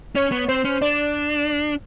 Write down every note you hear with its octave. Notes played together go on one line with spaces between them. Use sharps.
C#4 C#5
B3
C4 C5
C#4
D4 D5